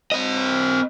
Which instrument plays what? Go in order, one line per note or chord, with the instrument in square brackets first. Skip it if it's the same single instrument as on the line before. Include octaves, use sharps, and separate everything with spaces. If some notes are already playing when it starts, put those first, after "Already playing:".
[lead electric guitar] C4 D#5